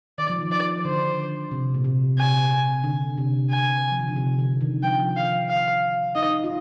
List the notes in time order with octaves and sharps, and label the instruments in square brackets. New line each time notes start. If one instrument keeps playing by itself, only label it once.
[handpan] D#3 [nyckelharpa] D5
[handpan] F3
D#3
[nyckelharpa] D5
[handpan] D3 [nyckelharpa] C5
[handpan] C3
A#2
C3
[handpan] C3 [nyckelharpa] G#5
[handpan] D3
C3
[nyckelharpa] G#5
[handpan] F3
D#3
D3
C3
D3
D#3
[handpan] F3 [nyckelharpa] G5
[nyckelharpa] F5
F5
[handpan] D#4 [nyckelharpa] D#5
[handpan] F4